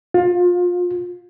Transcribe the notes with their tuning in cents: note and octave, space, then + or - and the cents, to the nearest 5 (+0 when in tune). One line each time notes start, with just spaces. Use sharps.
F4 +30